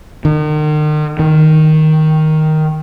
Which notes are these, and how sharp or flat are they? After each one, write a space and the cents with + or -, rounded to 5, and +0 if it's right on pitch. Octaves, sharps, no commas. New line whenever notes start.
D#3 -40
D#3 +5